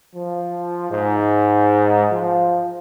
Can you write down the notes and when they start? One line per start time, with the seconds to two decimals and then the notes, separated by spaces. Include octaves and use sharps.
0.15 F3
0.90 G#2
2.12 F3